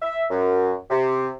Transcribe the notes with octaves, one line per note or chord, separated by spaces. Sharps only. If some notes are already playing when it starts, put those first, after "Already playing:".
E5
F#2
C3